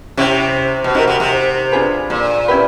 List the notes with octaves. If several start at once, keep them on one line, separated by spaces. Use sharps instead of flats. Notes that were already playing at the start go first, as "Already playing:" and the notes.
C3 C#4 E4 G4
B2
C3 D#4 F#4 A#4
C3
C3
D4 F4 G#4 B4
A#2
C#4 E4 G4 B4